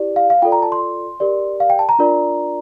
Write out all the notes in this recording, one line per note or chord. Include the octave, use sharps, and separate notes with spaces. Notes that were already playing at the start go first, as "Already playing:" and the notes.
Already playing: E4 G4 D5
F5
F5
F4 A4 D5 G5
A#5
A5
C6
G4 A#4 D5
F5
G5
A5
A#5
D4 F4 A#4 D5